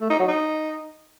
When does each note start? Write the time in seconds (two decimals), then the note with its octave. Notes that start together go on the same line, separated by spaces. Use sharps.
0.01 A3
0.10 D#4
0.19 F#3
0.28 D#4